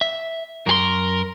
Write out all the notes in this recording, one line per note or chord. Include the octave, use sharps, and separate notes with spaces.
E5
F#2 G#4 A#4 C6